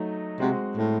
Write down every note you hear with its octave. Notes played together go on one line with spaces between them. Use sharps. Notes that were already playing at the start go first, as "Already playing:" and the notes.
Already playing: F#3 A3 D#4
C3 G#3 C4 F#4
A2